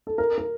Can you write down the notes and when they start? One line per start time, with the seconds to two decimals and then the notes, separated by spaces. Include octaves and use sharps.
0.07 A4
0.18 A#4
0.38 A#4